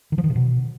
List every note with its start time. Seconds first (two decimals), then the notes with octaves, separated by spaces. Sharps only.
0.12 D#3
0.18 F3
0.24 D#3
0.30 C3
0.36 B2